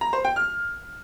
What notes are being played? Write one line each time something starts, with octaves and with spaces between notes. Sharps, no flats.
A#5
C5
G5
F6